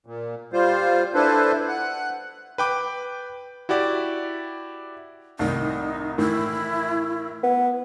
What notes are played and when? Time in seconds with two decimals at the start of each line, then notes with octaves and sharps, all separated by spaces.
0.06 A#2
0.53 G3 F4 C5
1.15 D4 E4 A4 B4 C5
1.68 F#5
2.58 B4 G5 D6
3.69 E4 F#4 G4 D5
5.39 C2 A2 D#3 D#4
6.18 A2 D#3 E3 E4
7.43 B3